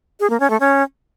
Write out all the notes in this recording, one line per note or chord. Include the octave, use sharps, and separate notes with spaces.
G#4
A#3
C#4
A3
C#4